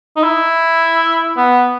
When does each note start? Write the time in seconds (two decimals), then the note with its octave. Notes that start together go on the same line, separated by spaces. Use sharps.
0.16 D#4
0.23 E4
1.37 B3